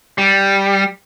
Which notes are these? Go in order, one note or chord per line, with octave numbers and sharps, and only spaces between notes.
G3